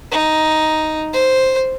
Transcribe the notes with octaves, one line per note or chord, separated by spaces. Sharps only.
D#4
C5